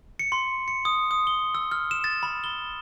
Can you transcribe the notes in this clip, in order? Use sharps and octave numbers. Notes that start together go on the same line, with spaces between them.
C#7
C6
C#7
D#6
D#6
G7
E6
F6
E7
A6
B5
G7